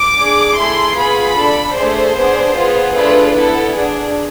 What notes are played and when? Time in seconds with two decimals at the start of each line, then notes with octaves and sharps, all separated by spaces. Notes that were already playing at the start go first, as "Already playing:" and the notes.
Already playing: D6
0.18 D4 G#4
0.58 A3 E4 G#4 C6
0.97 B3 F4 G#4 B5
1.38 D4 A4
1.77 A3 D4 G#4 C5
2.16 B3 D4 G#4
2.56 B3 F4 G#4
2.95 A3 D4 F4 G#4 B4
3.35 B3 E4 A4
3.74 D4 G#4